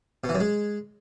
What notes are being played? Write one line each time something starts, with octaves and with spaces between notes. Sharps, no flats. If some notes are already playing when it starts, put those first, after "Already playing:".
B2
E3
F#2
G#3